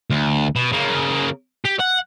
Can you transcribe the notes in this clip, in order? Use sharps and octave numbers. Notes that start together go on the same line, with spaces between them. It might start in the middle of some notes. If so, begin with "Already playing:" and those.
D2
B2
C#3 A#3
G4
F#5